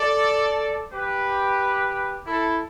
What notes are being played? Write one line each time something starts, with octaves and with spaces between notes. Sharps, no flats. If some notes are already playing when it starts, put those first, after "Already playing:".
Already playing: A4 D5
G4 B4
E4 A4